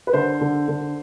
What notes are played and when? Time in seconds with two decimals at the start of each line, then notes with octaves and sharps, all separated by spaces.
0.07 B4
0.13 D3 C5
0.41 D3
0.68 D3